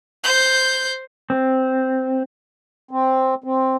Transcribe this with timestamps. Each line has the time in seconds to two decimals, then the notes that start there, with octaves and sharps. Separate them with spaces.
0.24 C5 G6
1.30 C4
2.91 C4
3.44 C4